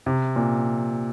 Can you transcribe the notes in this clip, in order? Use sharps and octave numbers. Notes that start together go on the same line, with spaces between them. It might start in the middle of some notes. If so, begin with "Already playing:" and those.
C3
A#2